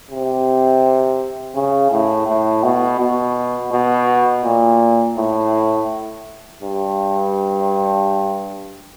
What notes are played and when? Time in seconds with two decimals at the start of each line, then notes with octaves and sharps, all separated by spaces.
0.10 C3
1.55 C#3
1.91 A2
2.27 A2
2.63 B2
3.00 B2
3.72 B2
4.45 A#2
5.17 A2
6.61 G2